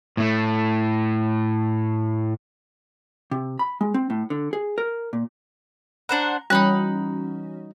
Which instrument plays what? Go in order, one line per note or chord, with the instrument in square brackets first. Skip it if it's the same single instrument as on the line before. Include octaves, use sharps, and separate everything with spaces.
[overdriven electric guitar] A2 A3
[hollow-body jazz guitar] C3
B5
G#3
C4
A2
D3
G#4
A#4
A#2
[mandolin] D4 C5 F#5 [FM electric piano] A#5 [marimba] B5
[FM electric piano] E3 C#4 F#4 [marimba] G3 [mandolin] D#4 B5 F#6